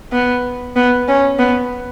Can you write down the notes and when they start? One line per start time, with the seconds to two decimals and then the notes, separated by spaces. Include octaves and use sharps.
0.12 B3
0.76 B3
1.08 C#4
1.39 B3